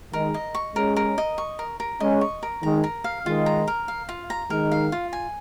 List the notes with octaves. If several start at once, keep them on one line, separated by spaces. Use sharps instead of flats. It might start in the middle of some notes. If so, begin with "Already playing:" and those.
D#3 G#3 A#4
D#5
C#6
G#3 C#4 A#4
A#4
D#5
C#6
A#4
A#4
G#3 C#4 D#5
C#6
A#4
D#3 G#3 A#5
A#4
F5
D#3 G#3 F4
A#5
A#4
F5
F4
A#5
D#3 G#3 A#4
F5
F4
G#5